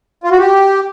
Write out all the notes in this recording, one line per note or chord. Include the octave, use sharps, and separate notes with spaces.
F4
F#4
G4